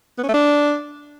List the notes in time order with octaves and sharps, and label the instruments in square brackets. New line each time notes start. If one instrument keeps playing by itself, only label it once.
[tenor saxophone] B3
C#4
A3
D4